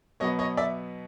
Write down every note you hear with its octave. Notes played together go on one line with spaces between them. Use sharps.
B2 F#3 B3 C#5 D#5
C#5 D#5
D5 E5